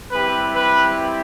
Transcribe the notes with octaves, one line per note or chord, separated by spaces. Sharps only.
G3 C4 E4 G4 B4
B4